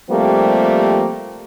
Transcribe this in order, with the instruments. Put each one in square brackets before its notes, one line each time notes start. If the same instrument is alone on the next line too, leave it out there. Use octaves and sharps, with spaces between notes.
[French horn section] F3 G3 A3 A#3 C4 G4